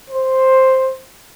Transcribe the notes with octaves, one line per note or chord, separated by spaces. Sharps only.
C5